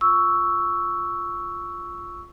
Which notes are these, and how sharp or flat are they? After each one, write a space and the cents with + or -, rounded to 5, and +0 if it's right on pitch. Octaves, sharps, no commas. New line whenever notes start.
F4 +0 C#6 +10 E6 +0